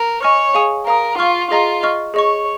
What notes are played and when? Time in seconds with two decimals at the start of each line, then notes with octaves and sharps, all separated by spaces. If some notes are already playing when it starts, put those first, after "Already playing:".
Already playing: A#4
0.22 C#5 D#5 G#5 C#6 F6
0.55 G#4 F5 G#5 D#6
0.87 A#4 F5 A#5 D#6
1.18 F4 F5 C#6 F6
1.51 F4 G#4 D#5 A#5
1.83 D#5 C#6 F6
2.14 G#4 C#5 D#5 C#6